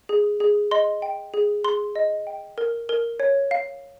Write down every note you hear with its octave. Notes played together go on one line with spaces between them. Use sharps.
G#4
G#4
D#5 C6
G5
G#4
G#4 C6
D#5
G5
A#4
A#4
C#5
F5